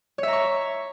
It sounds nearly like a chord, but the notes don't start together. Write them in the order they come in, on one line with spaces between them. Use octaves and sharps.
C#5 E5 A#5 C#6